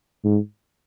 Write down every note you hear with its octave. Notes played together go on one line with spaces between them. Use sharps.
G#2